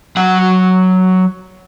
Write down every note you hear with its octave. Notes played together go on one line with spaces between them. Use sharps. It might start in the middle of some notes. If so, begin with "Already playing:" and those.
F#3 F#5